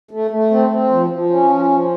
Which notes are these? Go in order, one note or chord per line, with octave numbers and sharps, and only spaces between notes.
A3
A3
C4
C4
F3
F3
C#4
F3
F3